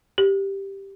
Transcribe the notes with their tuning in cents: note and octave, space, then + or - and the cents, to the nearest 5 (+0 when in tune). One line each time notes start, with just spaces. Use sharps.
G4 +0